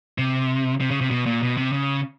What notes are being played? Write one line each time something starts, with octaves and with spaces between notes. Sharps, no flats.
C3
C3
C#3
C3
B2
A#2
B2
C3
C#3